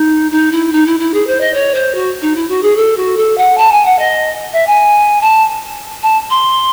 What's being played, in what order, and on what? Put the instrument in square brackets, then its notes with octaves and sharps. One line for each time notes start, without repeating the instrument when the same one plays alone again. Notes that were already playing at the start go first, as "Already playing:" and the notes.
Already playing: [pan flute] D#4
D#4
E4
D#4
E4
E4
G#4
C5
D#5
C#5
C5
F#4
D#4
E4
F#4
G#4
A4
F#4
A4
F#5
A5
G#5
F#5
D#5
E5
G#5
A5
A5
C6